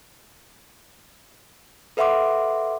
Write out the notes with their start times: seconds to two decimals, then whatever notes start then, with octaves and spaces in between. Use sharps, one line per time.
1.97 A4 B4 E5 F#5 C6 D6